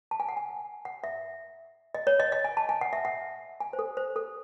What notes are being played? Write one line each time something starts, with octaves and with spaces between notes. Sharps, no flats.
A5
G#5
F#5
G#5
F#5
E5
D#5
C#5
D#5
D#5
G#5
A5
G#5
F#5
E5
F#5
G#5
C5
A4
C5
A4